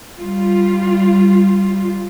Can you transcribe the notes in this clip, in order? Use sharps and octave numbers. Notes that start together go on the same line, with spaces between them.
G3 F4